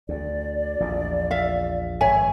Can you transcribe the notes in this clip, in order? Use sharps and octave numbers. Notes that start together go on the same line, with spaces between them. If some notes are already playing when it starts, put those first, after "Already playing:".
D2 D5
A#1 E2 A#2
E5 F5
G#1 G2 C#5 E5 G#5